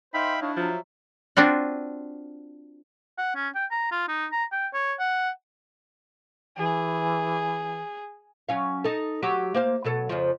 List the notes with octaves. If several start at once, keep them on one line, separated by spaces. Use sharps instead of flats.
D#4 C5 E5 F5 G5 B5
D4 E4 C#5 D#5 F5
F3 F#3 E5
C4 D4 F4 F#4
F#5
C#4
G5
A#5
F4
D#4
A#5
G5
C#5
F#5
E3 G#4
F#3 C#4 F5
D#4 A4
F#3 F#4 G4
A#3 C5 F5
B2 F#3 A4
F2 C#3 F3